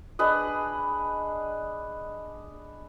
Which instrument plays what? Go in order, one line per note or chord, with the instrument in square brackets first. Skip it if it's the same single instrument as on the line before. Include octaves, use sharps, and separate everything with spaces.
[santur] D4 G#4 B4 D#5